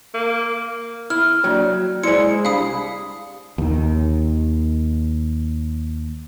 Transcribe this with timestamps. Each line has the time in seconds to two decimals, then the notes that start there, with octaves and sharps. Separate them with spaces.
0.15 A#3
1.10 E4 F6
1.44 F#3 A#3 D4 D5
2.03 G#3 E4 C5 D5 C6 C#7
2.45 C2 D4 F5 B5 D#6
3.58 D#2 D#3